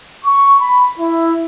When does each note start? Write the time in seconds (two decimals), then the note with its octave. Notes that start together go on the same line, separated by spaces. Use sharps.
0.25 C#6
0.60 B5
0.98 E4